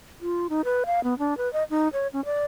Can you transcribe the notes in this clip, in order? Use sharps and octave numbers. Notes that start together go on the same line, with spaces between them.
F4
D#4
B4
F5
B3
D4
B4
D#5
D#4
C#5
C#4
D5